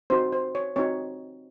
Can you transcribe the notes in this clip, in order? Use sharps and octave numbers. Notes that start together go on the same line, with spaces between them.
C4 D#4 F#4 C5
C5
C#5
C4 D#4 F#4 C#5